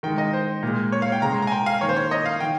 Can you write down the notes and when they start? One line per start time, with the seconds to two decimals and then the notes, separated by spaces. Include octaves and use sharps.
0.03 D#3 G#3 G5
0.18 D#5
0.33 C5
0.63 A#2 G#3
0.92 C#5
1.02 F5
1.12 G5
1.22 C#3 G#3 A#5
1.32 C6
1.42 A#5
1.47 G#5
1.52 G5
1.66 F5
1.81 D#3 A#3 C#5
1.89 C5
1.96 C#5
2.11 D#5
2.26 F5
2.40 D#3 G5